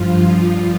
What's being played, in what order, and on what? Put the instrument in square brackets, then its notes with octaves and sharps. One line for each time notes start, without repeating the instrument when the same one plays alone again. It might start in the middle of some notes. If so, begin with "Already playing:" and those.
Already playing: [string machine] G2 F3 F4